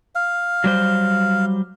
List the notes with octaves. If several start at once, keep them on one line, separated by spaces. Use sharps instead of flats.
F5
F#3 G3 C5